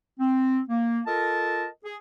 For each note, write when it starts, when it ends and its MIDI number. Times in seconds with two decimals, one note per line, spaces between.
0.19 0.60 60
0.69 1.01 58
1.06 1.67 65
1.06 1.67 69
1.06 1.67 70
1.06 1.67 75
1.06 1.67 81
1.84 1.97 68